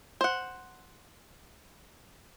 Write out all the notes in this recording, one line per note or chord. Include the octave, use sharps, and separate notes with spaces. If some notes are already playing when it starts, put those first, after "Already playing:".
C5 F#5